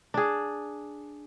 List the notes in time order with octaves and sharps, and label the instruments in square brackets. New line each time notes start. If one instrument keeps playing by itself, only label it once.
[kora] D4 G#4